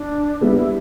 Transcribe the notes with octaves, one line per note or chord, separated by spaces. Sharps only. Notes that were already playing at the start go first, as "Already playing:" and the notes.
Already playing: D4
G3 B3 E4
E4